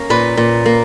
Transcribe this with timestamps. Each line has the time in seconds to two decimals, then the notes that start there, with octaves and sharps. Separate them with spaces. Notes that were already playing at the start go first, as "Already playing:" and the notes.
Already playing: A#3 C#4 C#5
0.10 A#2 B4
0.37 A#2
0.66 A#3